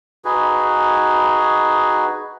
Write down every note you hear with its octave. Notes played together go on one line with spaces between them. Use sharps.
D#4 F#4 G#4 B4